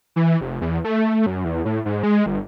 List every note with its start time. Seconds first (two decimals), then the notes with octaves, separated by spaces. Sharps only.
0.16 E3
0.41 F1
0.61 E2
0.84 A3
1.26 F#2
1.45 E2
1.65 A2
1.85 G#2
2.03 G#3
2.26 G1